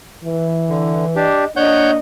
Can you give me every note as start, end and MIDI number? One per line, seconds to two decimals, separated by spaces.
0.24 1.28 52
0.69 1.05 50
1.16 1.45 62
1.16 1.45 67
1.16 1.52 75
1.56 1.99 58
1.56 1.99 62
1.56 1.91 73
1.56 1.98 75
1.56 1.91 78
1.56 1.91 91